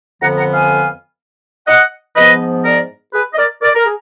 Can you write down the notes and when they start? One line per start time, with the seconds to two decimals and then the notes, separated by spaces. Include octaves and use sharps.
0.21 F2 D3 F3 B3 F#5 A#5
0.37 F#5 A#5
0.53 F5 G#5
1.67 D#5 F#5
2.15 G#2 F3 B3 B4 D#5
2.64 A#4 D5
3.13 G#4 B4
3.34 D#5
3.38 A#4 D5
3.62 A#4 D5
3.75 A#4
3.86 G#4